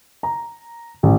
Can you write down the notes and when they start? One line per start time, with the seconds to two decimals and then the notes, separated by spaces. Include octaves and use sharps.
0.23 A#5
1.03 A1